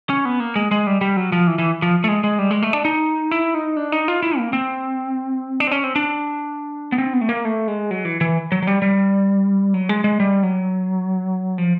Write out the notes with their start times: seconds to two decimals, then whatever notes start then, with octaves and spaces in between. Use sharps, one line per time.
0.10 C#4
0.25 B3
0.40 A#3
0.56 G#3
0.71 G#3
0.87 G3
1.01 G3
1.17 F#3
1.32 F3
1.47 E3
1.58 E3
1.82 F3
2.04 A3
2.08 G#3
2.24 G#3
2.39 G3
2.51 G#3
2.62 A3
2.73 D4
2.85 D#4
3.31 E4
3.54 D#4
3.77 D4
3.92 D#4
4.08 F4
4.22 E4
4.38 A#3
4.53 C4
5.60 D4
5.67 C4
5.71 C#4
5.84 C4
5.96 D4
6.92 B3
6.98 C4
7.13 B3
7.21 A3
7.29 A#3
7.45 A3
7.68 G#3
7.91 F#3
8.05 E3
8.21 E3
8.52 F#3
8.63 F#3
8.67 G3
8.82 G3
9.74 F#3
9.89 G#3
10.04 G#3
10.20 G3
10.43 F#3
11.58 F3